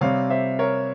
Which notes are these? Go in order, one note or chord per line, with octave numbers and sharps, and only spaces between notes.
C3 G3 C4 C#5 F5
C5 E5
A#4 C#5